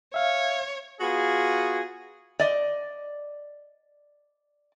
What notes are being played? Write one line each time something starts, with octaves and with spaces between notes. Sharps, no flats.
C#5 E5 F5
B3 F4 F#4 G#4
D5 D#5